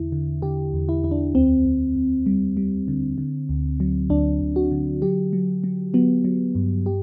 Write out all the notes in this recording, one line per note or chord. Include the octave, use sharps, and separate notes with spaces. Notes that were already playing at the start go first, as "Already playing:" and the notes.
Already playing: E2 D3 E4
D3
D3 G4
E2
E4
E2 E4
D4
D2 C4
D2
D2
G3
G3
D3
D3
D2
F#3
D2 D4
D2
F#4
D3
F#3 G4
F#3
F#3
F#3 B3
F#3
G2
G4